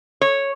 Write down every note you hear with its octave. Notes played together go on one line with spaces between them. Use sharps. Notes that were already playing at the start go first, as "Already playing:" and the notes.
C#5